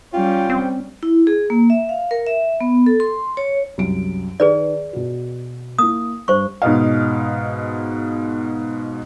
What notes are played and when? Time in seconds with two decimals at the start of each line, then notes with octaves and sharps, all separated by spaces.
0.14 G3 C#4 F4 G5
0.50 C4
1.03 E4
1.27 G#4
1.50 A#3
1.70 E5
1.89 F5
2.11 A#4
2.27 E5
2.61 B3
2.86 A4
3.00 C6
3.37 C#5
3.78 C2 F#2 D7
4.40 D#3 G#4 B4 D5
4.93 B2 F#4
5.79 A#3 E4 D#6
6.28 G2 C5 C#6
6.62 G#2 B2 D#5 F5